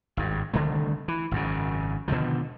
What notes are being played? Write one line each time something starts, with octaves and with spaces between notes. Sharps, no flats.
G#1 G2
C2 D3 D#3 A3
E3
G#1 F#2 C#3
B2 D3 D#3 F3